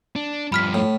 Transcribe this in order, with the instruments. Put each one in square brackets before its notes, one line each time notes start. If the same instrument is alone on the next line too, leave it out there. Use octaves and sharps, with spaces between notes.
[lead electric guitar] D4
[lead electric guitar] G2 F3 [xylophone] B5 F6 B6
[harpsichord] A2